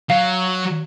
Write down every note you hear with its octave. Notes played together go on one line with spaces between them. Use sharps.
F#3 F5